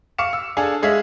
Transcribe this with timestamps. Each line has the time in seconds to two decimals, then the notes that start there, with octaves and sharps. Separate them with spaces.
0.18 F5 C#6 D6 C#7 E7
0.33 E6
0.57 D4 G#4 A4 F5 G#5
0.83 G#3 G#4 C#5 E5 F5